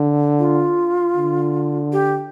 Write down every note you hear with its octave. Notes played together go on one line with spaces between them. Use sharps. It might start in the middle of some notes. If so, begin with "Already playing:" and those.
Already playing: D3
F4
D3
G4